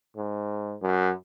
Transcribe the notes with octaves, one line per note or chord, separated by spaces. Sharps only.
G#2
F#2